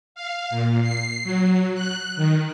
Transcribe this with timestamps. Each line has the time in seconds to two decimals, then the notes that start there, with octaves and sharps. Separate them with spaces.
0.15 F5
0.50 A#2
0.82 C7
1.24 F#3
1.74 F#6
2.16 D#3